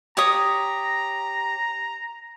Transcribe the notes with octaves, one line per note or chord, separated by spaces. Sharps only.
G4 C#5 A#5 D#6